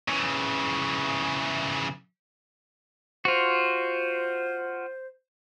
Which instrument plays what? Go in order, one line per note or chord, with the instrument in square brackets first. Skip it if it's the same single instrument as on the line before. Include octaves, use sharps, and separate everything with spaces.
[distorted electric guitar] C#3 E3
[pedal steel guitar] F4 F#4 [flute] C5